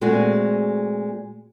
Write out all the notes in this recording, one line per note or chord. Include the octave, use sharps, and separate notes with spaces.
A#2 G#3 A3 C4 F#4 G#4